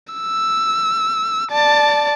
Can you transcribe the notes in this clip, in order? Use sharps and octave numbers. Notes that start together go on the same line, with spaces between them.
E6
D5 A5